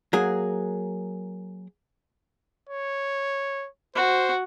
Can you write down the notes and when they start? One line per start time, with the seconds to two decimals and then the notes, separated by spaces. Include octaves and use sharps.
0.13 F#3 A#3 G#4
2.69 C#5
3.95 F#4 C5